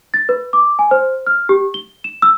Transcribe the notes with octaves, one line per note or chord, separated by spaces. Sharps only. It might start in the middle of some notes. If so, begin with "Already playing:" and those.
A6
B4
D6
G#5
C5
F6
G4
G7
E7
E6